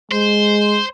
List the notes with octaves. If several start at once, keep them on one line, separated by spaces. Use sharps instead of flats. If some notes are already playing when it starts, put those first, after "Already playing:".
G#3 C5